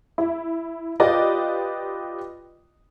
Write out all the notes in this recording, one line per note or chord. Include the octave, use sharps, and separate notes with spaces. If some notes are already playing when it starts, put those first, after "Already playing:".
E4
F4 G4 B4 D5 D#5